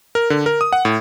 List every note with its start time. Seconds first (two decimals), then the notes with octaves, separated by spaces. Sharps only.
0.15 A#4
0.30 D3
0.46 A#4
0.61 D#6
0.73 F#5
0.85 A2